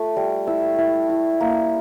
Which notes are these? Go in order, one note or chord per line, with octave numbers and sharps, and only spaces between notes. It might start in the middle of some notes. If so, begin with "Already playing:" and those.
Already playing: A3 F4
G3
E4 E6
E4
E4
A#3